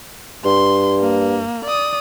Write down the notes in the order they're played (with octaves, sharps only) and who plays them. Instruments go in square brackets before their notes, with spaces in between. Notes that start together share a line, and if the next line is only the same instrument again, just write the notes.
[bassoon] G2 [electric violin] C6
[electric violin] A#3
D5 D#6